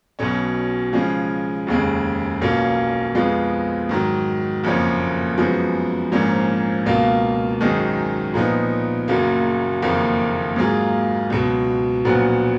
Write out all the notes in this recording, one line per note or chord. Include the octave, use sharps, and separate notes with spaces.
B1 B2 F#3 C#4
C#3 F3 G#3 C#4
F1 D#2 C#3 G#3
B1 B2 A#3 C#4 F4
F2 F3 G#3 B3 F4
G#2 D#3 F#3
F#1 F2 F3 A#3 C#4
F#2 F3 G#3 B3
A#1 G#2 F3 A#3 C#4
C#2 B2 A#3 F4
G#1 F#2 D#3 G#3 D#4
A#2 F3 B3 D#4
F#1 F#2 C#3 F#3 A#3
F#1 F2 D#3 A#3
G#2 F#3 A#3 F4 G#4
C#2 B2 F#3
A#1 A#2 F#3 B3 F#4